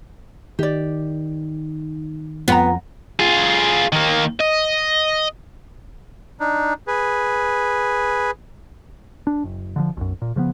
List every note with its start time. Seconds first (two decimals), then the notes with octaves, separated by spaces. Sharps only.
0.59 D#3 G4 D5
2.48 F2 B3 F4 G5 A#5
3.20 F4 G#4
3.92 D#3 A#3
4.40 D#5
6.40 D4 D#4
6.87 G#4 B4
9.27 D4
9.44 F#1
9.76 D3 D#3 F3
9.97 B1 F#2
10.22 A#2
10.36 C#3 F3 G#3 B3